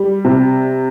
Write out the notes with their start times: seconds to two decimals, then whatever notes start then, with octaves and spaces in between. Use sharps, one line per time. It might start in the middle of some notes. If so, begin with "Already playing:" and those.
Already playing: G3
0.25 C3